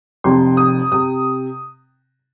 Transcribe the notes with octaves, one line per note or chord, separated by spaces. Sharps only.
F1 F2 C3 C6
D#6
C3 D#6